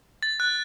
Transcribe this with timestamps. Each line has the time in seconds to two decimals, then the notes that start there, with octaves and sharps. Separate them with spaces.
0.23 A6
0.40 F#6